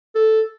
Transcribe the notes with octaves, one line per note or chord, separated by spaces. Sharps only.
A4